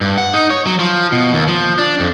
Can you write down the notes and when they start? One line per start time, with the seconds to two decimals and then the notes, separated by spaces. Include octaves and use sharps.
0.01 G2
0.18 F#5
0.33 D#4
0.50 C#5
0.66 F#3
0.79 F3
1.12 B2
1.33 D#2
1.48 F3
1.79 D4
2.00 F2